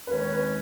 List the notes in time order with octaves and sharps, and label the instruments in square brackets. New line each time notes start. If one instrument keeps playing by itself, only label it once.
[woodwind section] D#2 D#3 G#3 C#4 [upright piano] B4
[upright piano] C#5
B4